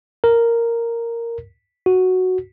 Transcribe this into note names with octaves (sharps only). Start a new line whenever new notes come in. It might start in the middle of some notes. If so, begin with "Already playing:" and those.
A#4
F#4